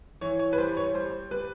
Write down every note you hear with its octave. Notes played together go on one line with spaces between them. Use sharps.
E3 C#5
C#5
B4
G3 C5
C#5
G3 C5
G3 B4